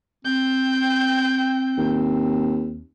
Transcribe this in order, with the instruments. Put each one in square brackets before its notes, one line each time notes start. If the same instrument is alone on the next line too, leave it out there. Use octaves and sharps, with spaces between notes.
[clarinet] C4 [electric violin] G5 G6
[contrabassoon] D#2